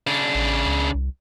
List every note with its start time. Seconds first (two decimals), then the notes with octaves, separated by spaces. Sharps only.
0.07 C#3 D4
0.34 A1
0.67 C#2
0.94 C2